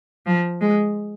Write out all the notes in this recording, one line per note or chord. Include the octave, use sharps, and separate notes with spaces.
F3
G#3